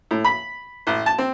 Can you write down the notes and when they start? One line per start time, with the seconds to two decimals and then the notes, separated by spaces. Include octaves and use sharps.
0.11 A2
0.24 B5
0.87 A1
1.06 A5
1.18 C4